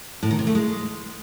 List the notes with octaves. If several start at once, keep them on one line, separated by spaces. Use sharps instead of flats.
A2
D#3
C3
A3
G#3